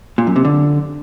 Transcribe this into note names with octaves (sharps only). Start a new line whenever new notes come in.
A#2
F#2
C3
D3